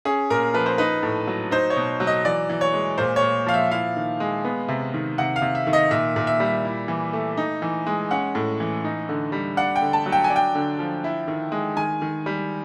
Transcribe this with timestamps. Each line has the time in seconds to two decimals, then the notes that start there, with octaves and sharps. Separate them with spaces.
0.05 C#4 G#4
0.30 A#2 A#4
0.54 F3 B4
0.66 C5
0.78 D#4 B4
1.03 A2
1.27 F#3
1.51 D#4 C5
1.70 C#5
1.76 B2
2.00 F#3
2.07 D#5
2.25 E3 D5
2.49 E3
2.61 C#5
2.74 G#3
2.98 A#2 C5
3.16 C#5
3.22 A#2
3.46 F3 F5
3.54 E5
3.71 E4 F5
3.96 D#3
4.20 G#3
4.45 B3
4.68 C3
4.94 D#3
5.18 C3 F#5
5.36 F5
5.42 C3
5.55 E5
5.67 D#3
5.73 D#5
5.91 A#2 E5
6.16 A#2
6.27 E5
6.40 G3
6.65 E4
6.88 E3
7.13 A3
7.37 D#4
7.62 E3
7.87 G#3
8.11 C#4 F#5
8.35 A2
8.60 E3
8.85 D#4
9.09 D3
9.32 G3
9.57 D4 F#5
9.76 G5
9.82 D3
9.93 A5
10.06 F#3
10.12 G5
10.24 G#5
10.30 D4
10.36 G5
10.55 D3
10.79 F3
11.04 E4
11.28 D#3
11.52 G#3
11.76 D#3 G#5
12.02 D#3
12.26 G3